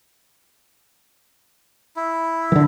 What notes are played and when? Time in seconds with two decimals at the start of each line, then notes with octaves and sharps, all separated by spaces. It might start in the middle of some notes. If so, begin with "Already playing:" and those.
1.96 E4
2.52 D3 E3